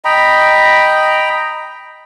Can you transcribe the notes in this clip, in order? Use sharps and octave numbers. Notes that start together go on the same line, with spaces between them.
D#5 G5 A#5 B5